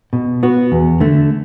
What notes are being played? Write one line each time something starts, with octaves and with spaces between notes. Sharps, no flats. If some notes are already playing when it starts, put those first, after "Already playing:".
B2
B3 F#4
E2
D3 A3